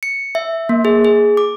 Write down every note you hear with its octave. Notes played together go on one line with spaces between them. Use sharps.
C#7
E5
A#3
G#4
G#4
D6